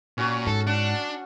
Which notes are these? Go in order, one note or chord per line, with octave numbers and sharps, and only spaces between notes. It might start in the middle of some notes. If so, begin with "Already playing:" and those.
A#2 C#4 F#4
G#2 A4
D4 F#5